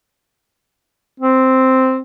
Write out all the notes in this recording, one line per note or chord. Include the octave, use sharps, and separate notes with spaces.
C4